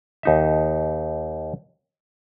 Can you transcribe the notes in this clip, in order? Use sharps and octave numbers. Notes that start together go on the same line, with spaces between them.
D#2 D#4 E5